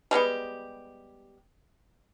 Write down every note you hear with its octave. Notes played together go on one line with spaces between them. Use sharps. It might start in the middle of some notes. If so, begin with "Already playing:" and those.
G3 G#3 B3 G4